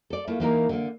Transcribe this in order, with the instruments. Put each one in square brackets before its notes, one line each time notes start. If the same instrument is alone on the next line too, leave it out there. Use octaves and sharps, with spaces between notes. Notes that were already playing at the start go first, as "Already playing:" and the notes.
[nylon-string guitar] A4 D5
A3 A#3 E4 F4
E3 A#3 D#4 A#4
D3 A#3